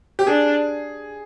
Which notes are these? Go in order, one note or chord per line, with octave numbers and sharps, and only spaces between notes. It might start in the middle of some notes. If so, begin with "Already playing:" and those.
G4
D4 G#4